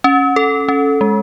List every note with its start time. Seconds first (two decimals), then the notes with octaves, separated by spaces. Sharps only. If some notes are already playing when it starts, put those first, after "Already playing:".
0.04 C#4
0.36 A4
0.68 C#4
1.01 G#3